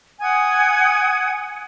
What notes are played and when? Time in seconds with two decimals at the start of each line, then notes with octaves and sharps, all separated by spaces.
0.21 F#5 G#5 D#6 G#6